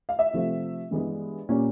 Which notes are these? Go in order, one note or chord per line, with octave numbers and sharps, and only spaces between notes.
F5
E5
C3 F3 A3 C4
G2 E3 G#3 B3
A#2 G3 A#3 C#4